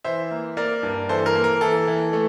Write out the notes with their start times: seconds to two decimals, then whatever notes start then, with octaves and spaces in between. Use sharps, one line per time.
0.04 E3 C5 E5
0.31 A#3
0.57 A#3 A#4 D5
0.83 G2
1.09 E3 A4 C5
1.26 A#4
1.35 A#3
1.44 A#4
1.61 E3 A4
1.88 E3
2.13 A3